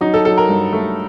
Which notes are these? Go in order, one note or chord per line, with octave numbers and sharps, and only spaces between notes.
F#3 D#4
A4
F#3 A4
A#4
G2
A3